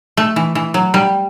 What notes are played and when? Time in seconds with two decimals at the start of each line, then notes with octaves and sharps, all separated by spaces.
0.17 A3
0.36 E3
0.55 E3
0.74 F#3
0.94 G3